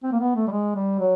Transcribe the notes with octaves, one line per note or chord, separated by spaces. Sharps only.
C4
A#3
B3
A3
G3
G#3
G3
F#3